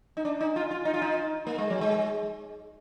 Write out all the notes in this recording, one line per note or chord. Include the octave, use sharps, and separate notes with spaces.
D#4
D4
D#4
F4
F4
D#4
F4
D#4
A#3
G#3
F#3
G#3